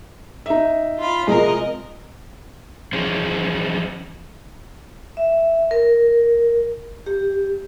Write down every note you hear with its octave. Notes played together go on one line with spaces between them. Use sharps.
D#4 E5
F4 B5
C3 F3 G#3 A#4 D#5
E3 F3 C#4 G#4 C5
E5
A#4
G4